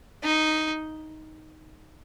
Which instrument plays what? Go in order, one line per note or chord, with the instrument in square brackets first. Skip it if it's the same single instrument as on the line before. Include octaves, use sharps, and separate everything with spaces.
[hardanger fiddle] D#4